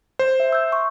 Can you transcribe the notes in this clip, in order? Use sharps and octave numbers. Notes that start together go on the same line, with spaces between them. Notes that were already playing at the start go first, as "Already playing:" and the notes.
C5
E5
E6 G6
C6 C#6 G6